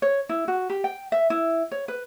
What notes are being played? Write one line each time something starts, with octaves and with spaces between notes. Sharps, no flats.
C#5
E4
F#4
G4
G5
E5
E4
C#5
B4